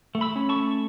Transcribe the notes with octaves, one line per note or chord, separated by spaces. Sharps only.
A3
B5 E6
C#4
A5 C#6
A3